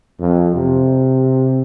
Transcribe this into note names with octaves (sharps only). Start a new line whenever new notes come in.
F2
C3